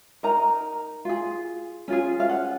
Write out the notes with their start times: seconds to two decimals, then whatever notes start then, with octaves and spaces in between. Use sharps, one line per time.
0.23 D#4 A#4 A#5
1.05 F4 G#4
1.88 C#4 F4 G#4
2.20 F5
2.29 F#5